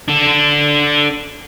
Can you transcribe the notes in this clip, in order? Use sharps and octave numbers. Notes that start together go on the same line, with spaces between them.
D4 A4